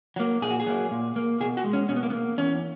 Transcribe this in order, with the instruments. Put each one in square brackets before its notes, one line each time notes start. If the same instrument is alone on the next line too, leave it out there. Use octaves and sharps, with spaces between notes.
[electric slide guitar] F#3 A#3
A#2 G#4
F#4
G#4
F#3 A#3
A#2
A#3
B2 G#4
F#4
G#3
C#4
B2 C#4
B3
A#3
B3
A#3
E2 C#4